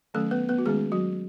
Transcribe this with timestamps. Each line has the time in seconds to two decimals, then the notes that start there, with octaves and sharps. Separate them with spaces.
0.14 D#3 F#3 A3 C#4 A4
0.31 B3 B4
0.49 B3 B4
0.58 F#4
0.66 D#3 G#3 A3 C#4 G#4
0.92 F#3 F#4